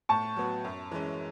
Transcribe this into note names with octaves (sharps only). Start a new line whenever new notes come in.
A2 A5 C#6
F#3 B3 F#4
F#2
E3 G#3 C#4